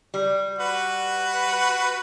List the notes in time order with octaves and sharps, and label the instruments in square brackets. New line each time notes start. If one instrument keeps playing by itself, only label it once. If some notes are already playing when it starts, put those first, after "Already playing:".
[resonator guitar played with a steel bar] G3
[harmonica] F#4 B4